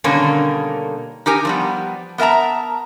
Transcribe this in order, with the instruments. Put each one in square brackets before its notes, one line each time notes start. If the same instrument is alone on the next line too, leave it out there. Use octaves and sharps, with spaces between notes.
[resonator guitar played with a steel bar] B2 D3 D#3 G3 A#3 C#4
D#4 G4 A#4 G#5
F3 G3 B3
B3 A#4 E5 A5 A#5